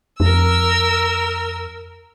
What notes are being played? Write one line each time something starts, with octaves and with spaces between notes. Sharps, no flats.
F2 A#4 E6